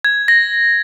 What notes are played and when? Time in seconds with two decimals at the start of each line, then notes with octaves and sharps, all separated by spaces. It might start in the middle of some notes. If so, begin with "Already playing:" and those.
0.05 G#6
0.28 A#6